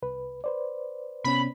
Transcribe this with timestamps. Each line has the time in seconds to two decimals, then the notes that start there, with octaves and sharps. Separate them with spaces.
0.02 C2 B4
0.44 B4 C5 D5
1.24 C3 B3 C#4 B5